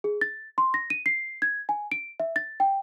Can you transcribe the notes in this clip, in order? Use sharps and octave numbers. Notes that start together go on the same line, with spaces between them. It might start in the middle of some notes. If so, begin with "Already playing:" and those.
G#4
A6
C6
A#6
D#7
C7
G#6
G#5
D7
E5
A6
G5